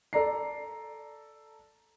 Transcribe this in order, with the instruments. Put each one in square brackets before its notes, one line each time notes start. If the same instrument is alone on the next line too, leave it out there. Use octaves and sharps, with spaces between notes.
[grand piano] A4 D5 A#5 C7